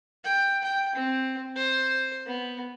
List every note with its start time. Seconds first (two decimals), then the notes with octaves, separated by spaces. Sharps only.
0.24 G5
0.64 G5
0.96 C4
1.56 C5
2.26 B3